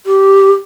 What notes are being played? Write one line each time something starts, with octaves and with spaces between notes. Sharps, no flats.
G4